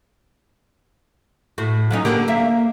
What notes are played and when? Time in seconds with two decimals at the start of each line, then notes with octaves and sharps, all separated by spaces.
1.58 A2 F#4
1.91 F#3 C#4 D#4
2.05 D3 A#3 G4
2.28 A#3 E5